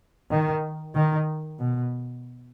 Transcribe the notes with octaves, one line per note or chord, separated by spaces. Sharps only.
D#3
D#3
B2